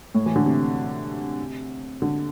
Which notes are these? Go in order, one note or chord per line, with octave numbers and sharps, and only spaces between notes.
A2
E3
D3
C3
D3